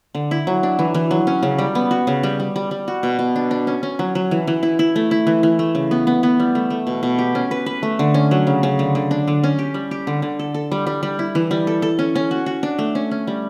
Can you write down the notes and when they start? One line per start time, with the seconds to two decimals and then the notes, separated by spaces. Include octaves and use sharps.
0.15 D3
0.31 E4
0.47 F#3
0.63 D4
0.79 E3
0.94 E3
1.11 F#3
1.27 C#4
1.43 C#3
1.58 G3
1.75 B3
1.91 F#4
2.07 C#3
2.23 G3
2.40 G3
2.56 G3
2.71 G3
2.88 F#4
3.03 B2
3.19 B2
3.36 D4
3.51 D4
3.67 C#4
3.83 C#4
3.99 F#3
4.15 F#3
4.31 E3
4.47 E3
4.63 E4
4.79 E4
4.96 A3
5.11 E4
5.27 E3
5.43 E3
5.59 A3
5.75 C#3
5.91 B3
6.07 B3
6.23 B3
6.39 G3
6.55 A3
6.70 A3
6.87 B2
7.03 B2
7.19 G4
7.35 C#4
7.51 B4
7.66 B4
7.83 A3
7.99 D3
8.14 C#4
8.31 F#3
8.47 C#3
8.63 C#3
8.79 D3
8.95 D3
9.11 D4
9.28 D3
9.44 C#4
9.59 G4
9.74 G3
9.91 G4
10.07 D3
10.22 D3
10.39 A4
10.54 A4
10.72 G3
10.87 G3
11.03 G3
11.19 E4
11.35 E3
11.51 G3
11.67 A4
11.82 A4
11.99 C#4
12.15 C#4
12.31 F#4
12.46 F#4
12.63 D4
12.79 A3
12.95 C#4
13.11 C#4
13.27 G3